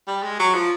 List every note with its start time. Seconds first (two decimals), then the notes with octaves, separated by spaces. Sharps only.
0.07 G3
0.23 G#3
0.39 F#3
0.54 F3